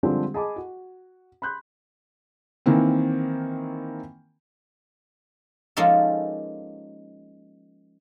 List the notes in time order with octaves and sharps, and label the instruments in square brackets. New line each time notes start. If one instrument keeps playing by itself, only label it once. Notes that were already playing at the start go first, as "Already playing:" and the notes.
[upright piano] D3 F3 G3 G#3 C4 D4
G#4 D#5 G#5 A5 B5 D6
F#4
B5 C6 F#6 G6
[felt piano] D#3 E3 A#3 C4
[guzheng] F3 G#3 A#3 C#4 D#4 A4